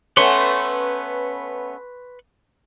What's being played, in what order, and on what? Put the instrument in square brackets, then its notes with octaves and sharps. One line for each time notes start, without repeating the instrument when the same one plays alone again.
[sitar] A3 B3 C#4 [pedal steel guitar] B4 C6 C#6